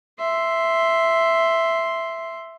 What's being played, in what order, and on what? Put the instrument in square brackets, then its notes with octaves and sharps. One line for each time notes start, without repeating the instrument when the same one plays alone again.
[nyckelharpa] E5 C6